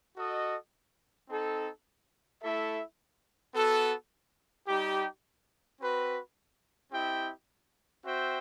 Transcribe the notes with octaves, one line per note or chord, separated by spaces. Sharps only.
F#4 A4 D#5
C4 D#4 A4
A3 E4 A4 E5
B3 F#4 A4
G3 D#4 G4
C4 F#4 B4
C4 E4 G4 D#5 G5
C4 F#4 C5 E5 G5